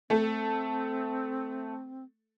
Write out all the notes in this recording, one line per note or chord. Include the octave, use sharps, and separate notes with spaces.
A3 C4 A4